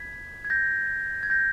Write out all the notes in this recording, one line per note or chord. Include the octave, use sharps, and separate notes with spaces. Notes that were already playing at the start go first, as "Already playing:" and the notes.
Already playing: B5 G6 G#6 B6
G#6
G6 A#6
G#6
G6 A#6